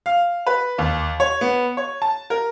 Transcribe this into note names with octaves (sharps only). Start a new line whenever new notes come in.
F5
B4
D#2
C#5
B3
C#5
A5
A#4